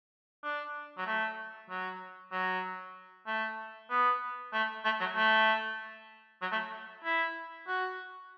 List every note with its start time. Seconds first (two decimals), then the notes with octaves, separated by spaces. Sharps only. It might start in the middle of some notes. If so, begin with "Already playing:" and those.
0.44 D4
0.97 F#3
1.06 A3
1.69 F#3
2.32 F#3
3.26 A3
3.90 B3
4.53 A3
4.85 A3
5.00 F#3
5.15 A3
6.42 F#3
6.52 A3
7.04 E4
7.67 F#4